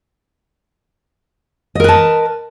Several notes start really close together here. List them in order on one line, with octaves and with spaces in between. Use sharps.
D#5 A#4 B4 A5